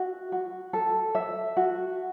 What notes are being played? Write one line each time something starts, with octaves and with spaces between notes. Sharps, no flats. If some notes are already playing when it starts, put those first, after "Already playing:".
Already playing: F#4 E5
F#4
A4
E5
F#4